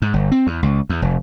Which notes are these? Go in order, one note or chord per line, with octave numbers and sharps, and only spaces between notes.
G#2
G1
C4
E2
C#2
E2
F1